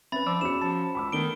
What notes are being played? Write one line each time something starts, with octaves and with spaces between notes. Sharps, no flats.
C4 C#4 B4 E5 B5 A6
F3 D5 D6 E6
E2 C#4 F#4 C#7 E7
F3 A5
C#2 B5 D6 E6
D#3 A3 B3 D4 D7 G7